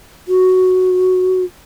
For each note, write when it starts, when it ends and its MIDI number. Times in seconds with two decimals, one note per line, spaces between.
0.28 1.44 66